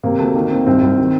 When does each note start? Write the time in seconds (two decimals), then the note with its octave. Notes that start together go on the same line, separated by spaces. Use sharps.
0.03 C3 A#3
0.18 D2 A3
0.35 D#3 A#3
0.51 D#3 C4
0.67 C2 C4
0.82 C2
0.98 D#3